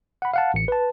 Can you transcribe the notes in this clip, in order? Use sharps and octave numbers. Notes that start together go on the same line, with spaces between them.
F#5 B5
F5 F#5 A5
A1 C#7
B4 A5